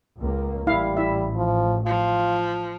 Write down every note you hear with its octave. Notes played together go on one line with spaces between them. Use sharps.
C#2 A#3
A1 G3 E4 F5
E4 E5
F3
F3 F4